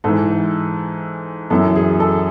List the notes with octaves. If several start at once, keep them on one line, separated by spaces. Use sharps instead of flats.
G#2 E3 A4
F#2 E3 A4
G#4
A4